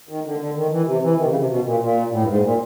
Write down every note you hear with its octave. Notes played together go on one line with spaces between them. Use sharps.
D#3
D3
D3
D#3
E3
C3
E3
D#3
C3
C#3
C3
B2
A#2
A#2
A2
G2
G#2
A#2